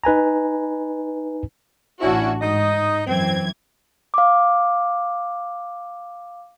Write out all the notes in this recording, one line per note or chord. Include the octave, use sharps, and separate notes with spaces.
D#4 B4 G#5 A#5
A1 C#4 D4 E4 F#4
G#2 D#4 D#5
F#2 E3 C4 G#6
F5 D6